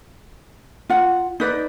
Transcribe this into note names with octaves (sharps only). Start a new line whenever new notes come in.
F4 F#5
D#4 B4 D5